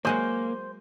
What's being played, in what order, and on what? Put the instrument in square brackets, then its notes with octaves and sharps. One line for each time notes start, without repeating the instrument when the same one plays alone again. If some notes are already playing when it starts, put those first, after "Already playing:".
[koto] F#3 G#3 F#5 [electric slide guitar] A#3 [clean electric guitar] C5